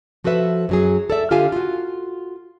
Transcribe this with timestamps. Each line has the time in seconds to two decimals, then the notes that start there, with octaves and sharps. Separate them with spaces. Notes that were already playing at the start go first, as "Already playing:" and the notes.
0.24 F3 F#4 A4 B4 E5
0.69 F#2 F#3 G#4
1.10 A4 D5 E5
1.31 D3 F4 G4 A4 F5 G#5
1.52 F4 F#4